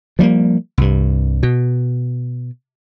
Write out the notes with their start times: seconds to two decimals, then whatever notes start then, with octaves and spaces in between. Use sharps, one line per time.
0.19 F3 G3 G#3 A#3
0.78 C2 G2
1.43 B2